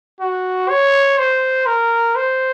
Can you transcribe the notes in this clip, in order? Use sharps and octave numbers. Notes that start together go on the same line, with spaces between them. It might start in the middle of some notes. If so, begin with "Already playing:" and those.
F#4
C#5
C5
A#4
C5